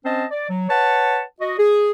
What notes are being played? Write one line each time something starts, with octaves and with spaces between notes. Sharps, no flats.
C4 C#4 C5 D#5 A5
D5
F#3
B4 C#5 F#5 A5
F#4 D#5
G#4